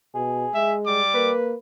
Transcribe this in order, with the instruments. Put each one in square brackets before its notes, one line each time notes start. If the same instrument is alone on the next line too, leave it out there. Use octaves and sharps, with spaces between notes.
[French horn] B2 [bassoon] G#4
[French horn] G#3 [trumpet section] E5
[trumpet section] G3 D5 D6
[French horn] A#3 [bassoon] B4